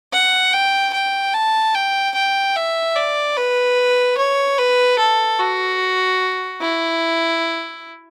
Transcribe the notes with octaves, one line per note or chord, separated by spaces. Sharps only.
F#5
G5
G5
A5
G5
G5
E5
D5
B4
C#5
B4
A4
F#4
E4